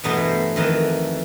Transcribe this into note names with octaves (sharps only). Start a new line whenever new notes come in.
E2 G2 B2 F#3 A3 B3
C5
F2 D#3 E3